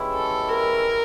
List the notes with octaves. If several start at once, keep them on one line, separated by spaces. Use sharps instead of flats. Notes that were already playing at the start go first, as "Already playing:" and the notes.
Already playing: E3 G#3 C#4 E4 G4
A4
A#4